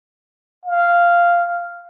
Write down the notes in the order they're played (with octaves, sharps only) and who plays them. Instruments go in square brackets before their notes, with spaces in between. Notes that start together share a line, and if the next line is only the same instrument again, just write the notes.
[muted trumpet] F5